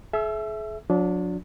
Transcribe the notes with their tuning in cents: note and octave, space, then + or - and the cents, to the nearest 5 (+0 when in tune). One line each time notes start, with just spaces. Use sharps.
G#4 +45 E5 +0 E6 +35
F#3 -45 D4 -20 F#4 -45